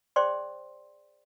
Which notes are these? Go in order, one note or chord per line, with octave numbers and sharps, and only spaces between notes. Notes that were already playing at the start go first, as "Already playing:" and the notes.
G#4 C5 D5 G5 C6